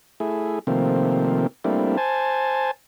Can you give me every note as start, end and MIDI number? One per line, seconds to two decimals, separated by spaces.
0.20 0.59 57
0.20 0.59 64
0.20 0.59 68
0.67 1.47 48
0.67 1.47 51
0.67 1.47 53
0.67 1.47 57
0.67 1.47 58
0.67 1.47 60
1.64 1.97 55
1.64 1.97 57
1.64 1.97 58
1.64 1.97 60
1.64 1.97 62
1.64 1.97 64
1.97 2.71 72
1.97 2.71 80
1.97 2.71 81